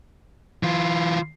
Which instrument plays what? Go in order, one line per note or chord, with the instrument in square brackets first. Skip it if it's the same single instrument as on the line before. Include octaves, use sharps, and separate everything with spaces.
[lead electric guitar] E3 F4